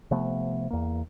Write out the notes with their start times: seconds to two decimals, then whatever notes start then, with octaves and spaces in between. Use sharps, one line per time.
0.11 C3 F3 A3 B3
0.71 E2 A#3